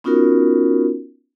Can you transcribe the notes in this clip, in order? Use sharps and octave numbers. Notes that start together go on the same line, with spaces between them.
B3 C#4 D#4 F4 F#4 A#4